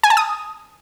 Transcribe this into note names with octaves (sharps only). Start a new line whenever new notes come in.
G#5
A5
D#6